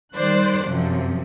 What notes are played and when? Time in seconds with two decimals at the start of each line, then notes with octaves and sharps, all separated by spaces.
0.14 D#3 G3 C5 D5 F#6
0.66 F#2 C3 F3